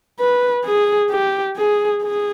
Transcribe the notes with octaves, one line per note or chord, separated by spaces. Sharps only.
B4
G#4
G4
G#4
G#4